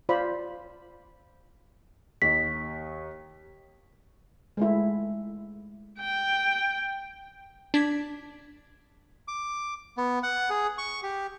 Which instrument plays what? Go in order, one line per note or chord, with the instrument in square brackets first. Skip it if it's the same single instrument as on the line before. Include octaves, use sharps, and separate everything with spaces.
[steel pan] F4 C5 D5 B5
[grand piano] D#2 D#4 [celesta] B6
[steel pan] G#3 A3 E4
[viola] G5
[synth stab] D4 G#6 B6
[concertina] D6
B3
F#5
G#4
C#6
G4